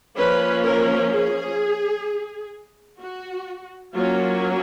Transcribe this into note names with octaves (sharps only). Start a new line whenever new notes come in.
F3 A#3 C#4 B4
A#4
G#4
F#4
F#3 A#3 C#4 F4